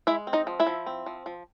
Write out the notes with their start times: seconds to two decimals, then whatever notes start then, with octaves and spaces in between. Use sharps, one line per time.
0.07 G#3 E4 E5
0.27 C4
0.33 D#4 D#5
0.47 F3
0.60 E4 E5
0.67 F3
0.86 C4
1.06 F3
1.26 F3